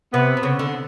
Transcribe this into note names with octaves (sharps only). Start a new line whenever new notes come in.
C3 B3
C3
C#3
D3